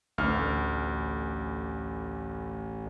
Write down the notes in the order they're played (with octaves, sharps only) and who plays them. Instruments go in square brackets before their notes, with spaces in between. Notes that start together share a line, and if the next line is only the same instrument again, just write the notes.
[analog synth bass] A1 [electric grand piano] D2 F6